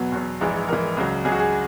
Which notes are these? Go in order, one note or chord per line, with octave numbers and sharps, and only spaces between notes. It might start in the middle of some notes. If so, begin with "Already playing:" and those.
Already playing: E2 B2 F#3 B4
E2 B2 F#3
A#1 G#2 E3
A#1 G#2 E3 A#4
C#2 C#3 F#3
C#2 C#3 F#3 G#4
F#4
G#4